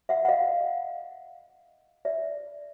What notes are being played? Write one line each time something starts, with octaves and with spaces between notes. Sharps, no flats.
E5 F#5
F#5
D#5 F5
D5 E5